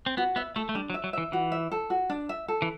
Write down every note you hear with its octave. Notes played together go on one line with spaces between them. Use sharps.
C4
B3 F#4
B3 E5
A3 A4
A3
G3 D4
F#3
E5
F#3
E3 E5
E3 F#4
E5
A4
F#4
D4
E5
A4
E3